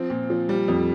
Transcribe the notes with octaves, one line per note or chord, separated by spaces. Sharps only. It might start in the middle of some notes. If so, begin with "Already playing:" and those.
Already playing: F3 C4
A#2
F3
G3
F2